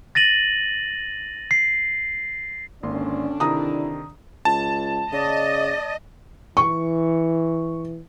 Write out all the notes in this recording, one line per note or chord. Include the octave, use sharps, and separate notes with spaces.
A6 A#6 D#7 F#7
C7
G#1 D3 A#3 C#4 D4 C6
C3 D#3 E4 A#5 D#6
C#2 A5
C#3 D5 D#5
E3 C#6